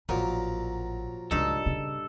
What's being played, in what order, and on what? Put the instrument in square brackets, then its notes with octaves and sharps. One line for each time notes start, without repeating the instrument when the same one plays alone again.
[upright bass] A1 [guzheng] A#2 [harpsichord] F3 F#3 A#4
[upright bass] C#2 C#3 [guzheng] G2 D#4 [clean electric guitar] A4
[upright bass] C#3 C#4